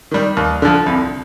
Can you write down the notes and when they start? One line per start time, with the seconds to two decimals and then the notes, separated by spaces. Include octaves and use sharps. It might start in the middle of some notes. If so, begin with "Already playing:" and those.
0.11 D#3 G3
0.37 D#2
0.62 D3 F3
0.86 C2